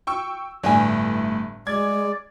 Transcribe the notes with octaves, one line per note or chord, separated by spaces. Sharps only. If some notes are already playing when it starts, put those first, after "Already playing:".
G5 C#6 E6
G1 A2 D4 B4 G#5
G#3 D5 G#6